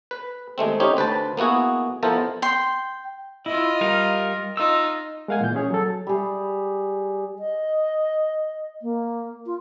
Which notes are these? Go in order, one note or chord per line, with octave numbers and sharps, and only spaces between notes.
B4
D#2 G#3 A3 C4
C4 C#4 D#4 G4 C5 C#5
D2 B4 C5 A5
A#3 B3 E4 F#4 G#4
F3 B3 E4 A4 A#4 C5
G5 C6
E4 F4 D#5
G3 A#4 F5
D#4 F4 E6
G#3 A#4 F5 F#5 G#5
A#2 E3 G6
C#4 G#4 C#5
F#3 A4
G3 G#4
D#5
A#3
F4